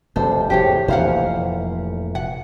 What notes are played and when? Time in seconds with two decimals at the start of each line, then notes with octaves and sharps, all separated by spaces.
0.16 F1 G2 A4 C5
0.50 E2 A2 G4 C5 C#5
0.88 F1 A#2 E3 C5 F5 F#5
2.15 F#5